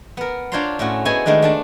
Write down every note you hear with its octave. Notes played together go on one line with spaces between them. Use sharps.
B3 A#4
D4 F4 C5 C#5 A#5 C6
A2 A3 C#4 F#4
B3 E4 G#4 C5 D#5 G#5
D#3 G#3 A3 B3 D4
A3 D4 A5